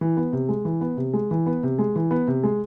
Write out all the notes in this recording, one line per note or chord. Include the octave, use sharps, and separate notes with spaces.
E3
B3
C3
G#3
E3
B3
C3
G#3
E3
B3
C3
G#3
E3
B3
C3
G#3